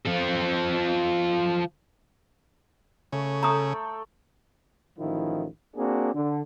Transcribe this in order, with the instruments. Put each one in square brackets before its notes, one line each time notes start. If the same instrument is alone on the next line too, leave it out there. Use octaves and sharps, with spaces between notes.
[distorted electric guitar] F3 A4
[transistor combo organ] C#3 [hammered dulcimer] A3 C#5
[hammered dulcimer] A3 A4 G5 [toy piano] A#5 D#6
[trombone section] A1 D#3 F3 E4
A#3 C4 D4 F#4 G#4
D3